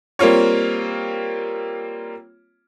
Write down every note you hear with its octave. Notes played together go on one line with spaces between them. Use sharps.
G3 A#3 C4 F4 C#5